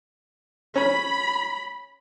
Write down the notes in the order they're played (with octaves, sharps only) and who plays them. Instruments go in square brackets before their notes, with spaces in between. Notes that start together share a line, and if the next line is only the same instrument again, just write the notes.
[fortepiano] C#4 [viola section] B5